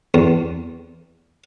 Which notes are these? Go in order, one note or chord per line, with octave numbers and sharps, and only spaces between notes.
E2